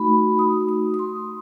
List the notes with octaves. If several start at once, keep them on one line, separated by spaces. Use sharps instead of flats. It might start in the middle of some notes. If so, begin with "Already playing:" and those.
Already playing: A3 D#4 F#4 B5
D#6
D#6
D#6
C6